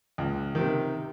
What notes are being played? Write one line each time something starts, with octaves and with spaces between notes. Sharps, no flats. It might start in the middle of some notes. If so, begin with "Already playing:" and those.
C#2
C3 D#3